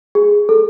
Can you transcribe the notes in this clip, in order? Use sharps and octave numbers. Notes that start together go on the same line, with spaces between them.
G#4
A4